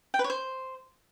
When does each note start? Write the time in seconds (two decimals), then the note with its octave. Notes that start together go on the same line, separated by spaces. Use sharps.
0.14 G5
0.19 B4
0.24 C#5
0.30 C5